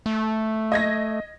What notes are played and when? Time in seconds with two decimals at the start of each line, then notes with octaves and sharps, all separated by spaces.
0.06 A3
0.72 D#5 G#6 A#6